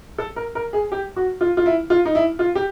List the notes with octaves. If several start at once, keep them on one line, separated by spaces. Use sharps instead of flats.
A4
A#4
A#4
G#4
G4
F#4
F4
F4
E4
F4
D#4
E4
F4
G4